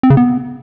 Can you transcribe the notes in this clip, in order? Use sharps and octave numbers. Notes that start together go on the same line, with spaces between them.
C4
C#3
B3